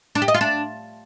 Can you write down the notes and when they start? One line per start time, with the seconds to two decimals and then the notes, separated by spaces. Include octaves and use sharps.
0.15 D4
0.22 G4
0.28 D#5
0.34 F4
0.41 D4